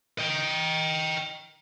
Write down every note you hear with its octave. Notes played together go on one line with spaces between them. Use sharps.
D#5 G5